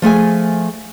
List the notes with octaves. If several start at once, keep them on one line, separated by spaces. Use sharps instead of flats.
F3 A3 G#4 G#5